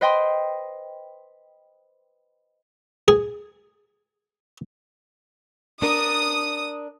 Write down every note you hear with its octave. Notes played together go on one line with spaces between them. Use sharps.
B4 C5 D#5 G5 C6
G#4
D4 A#4 D#6